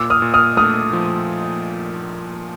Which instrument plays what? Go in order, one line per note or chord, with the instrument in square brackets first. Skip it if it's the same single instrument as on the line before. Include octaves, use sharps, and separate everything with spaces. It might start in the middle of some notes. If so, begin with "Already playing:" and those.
Already playing: [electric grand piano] A#2 [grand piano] D6 E6
[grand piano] D#6 F6
[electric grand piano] A#2
[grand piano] D#6 F6
[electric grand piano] A3 [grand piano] D#6 F6
[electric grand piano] F3